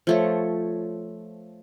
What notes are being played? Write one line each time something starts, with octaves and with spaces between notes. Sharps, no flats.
F3 A3 C#5